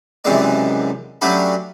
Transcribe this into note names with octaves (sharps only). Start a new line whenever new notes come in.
C#2 F#2 C3 E3 G#3 D5
F#3 A3 C#4 D4 G4 B5